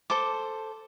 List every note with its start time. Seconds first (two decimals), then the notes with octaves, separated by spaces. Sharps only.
0.10 A4 C5 D6